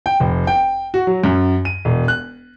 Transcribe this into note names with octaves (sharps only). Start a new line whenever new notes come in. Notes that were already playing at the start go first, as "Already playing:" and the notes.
G5
F1
G5
F#4
F#3
F#2
D#7
E1
F#6